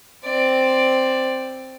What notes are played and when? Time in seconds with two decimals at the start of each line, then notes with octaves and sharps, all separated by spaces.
0.24 C4 D5